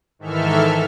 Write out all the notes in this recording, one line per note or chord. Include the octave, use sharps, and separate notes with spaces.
G#2 D#3 E3 A4 E5 F6